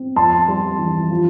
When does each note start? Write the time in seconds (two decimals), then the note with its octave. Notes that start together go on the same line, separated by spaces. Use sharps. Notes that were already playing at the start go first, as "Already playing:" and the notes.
Already playing: C4
0.16 F2 A5 C6
0.48 G3
0.79 E3
1.11 F3